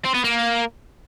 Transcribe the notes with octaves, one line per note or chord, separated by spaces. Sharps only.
C4
B3
A#3